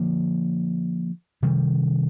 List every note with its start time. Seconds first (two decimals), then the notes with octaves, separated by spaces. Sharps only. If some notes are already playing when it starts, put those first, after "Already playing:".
Already playing: D3 F3 A#3
1.42 C3 D#3 G3